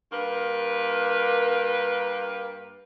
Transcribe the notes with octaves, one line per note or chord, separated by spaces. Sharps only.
G2 A#3 A#4 B4